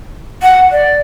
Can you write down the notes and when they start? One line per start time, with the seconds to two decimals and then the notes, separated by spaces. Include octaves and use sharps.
0.42 F#5
0.71 D5